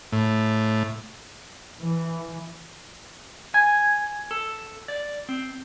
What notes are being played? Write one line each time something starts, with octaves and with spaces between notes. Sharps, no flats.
A2
E3
G#5
A4
D5
C4